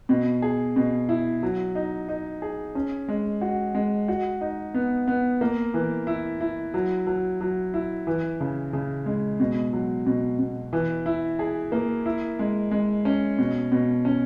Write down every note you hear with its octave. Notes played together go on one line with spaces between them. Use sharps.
B2
G#4
B2
E4
F#3
D#4
D#4
G#4
C#4
G#3
F#4
G#3
F#4
D#4
B3
B3
A#3
E3
E4
E4
F#3
F#3
F#3
E4
E3
C#3
C#3
G#3
B2
F#3
B2
B2
E3
E4
G#4
A#3
E4
G#3
G#3
C#4
B2
B2
C#4